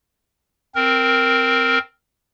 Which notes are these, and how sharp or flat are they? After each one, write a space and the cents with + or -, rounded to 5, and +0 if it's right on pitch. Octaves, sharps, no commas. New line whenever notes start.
C4 +0 A#4 +0